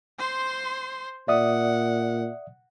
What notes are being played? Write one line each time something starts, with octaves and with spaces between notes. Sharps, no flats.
C5 C6
A#2 D5 E5 F#5 D#6